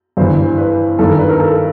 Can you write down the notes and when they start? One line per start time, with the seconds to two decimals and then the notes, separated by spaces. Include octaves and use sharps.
0.17 G2 E3 C5
0.58 B4
0.99 G2 D#3 A4
1.09 A#4
1.19 B4
1.29 A#4
1.40 A4